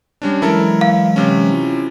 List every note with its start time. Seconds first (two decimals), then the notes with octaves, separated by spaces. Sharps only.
0.22 G3 C#4 D4
0.42 E3 F#3 G#3 E4 A4 A#4
0.81 F5
1.16 C3 C#4
1.51 E4 F4